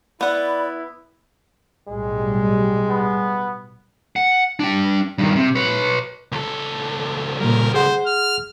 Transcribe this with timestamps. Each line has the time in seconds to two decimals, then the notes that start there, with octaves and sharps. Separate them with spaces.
0.21 B3 E4 D5 F#5 B5
1.88 B1 A2 G3 G#3
2.91 B3
4.16 F#5
4.60 D4 G5
5.18 G2 D#3
5.35 C3
5.55 B4 C#5
6.32 C#2 A4
7.40 A#2 G3 A#4
7.74 G#4 C5 F#5 C6
8.06 F6